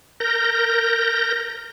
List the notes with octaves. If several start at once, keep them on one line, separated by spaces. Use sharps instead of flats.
A#4 G6 A#6